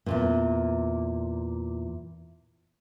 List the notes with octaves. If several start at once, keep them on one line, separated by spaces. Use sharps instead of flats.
E2 G2 A#2